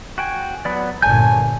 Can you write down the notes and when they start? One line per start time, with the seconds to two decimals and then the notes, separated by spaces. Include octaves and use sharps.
0.18 F#4 G5 G#5
0.65 F#3 B3 D5
1.02 G1 A#2 C#5 G#5 A5 G6